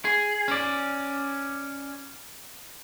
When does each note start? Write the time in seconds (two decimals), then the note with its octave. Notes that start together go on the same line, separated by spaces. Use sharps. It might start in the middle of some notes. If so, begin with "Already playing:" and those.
0.05 G#4
0.48 C#4 D5